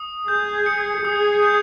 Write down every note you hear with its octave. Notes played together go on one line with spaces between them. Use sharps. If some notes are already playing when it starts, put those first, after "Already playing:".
Already playing: D#6
G#4 G6
C#7
G#4 D#6
G6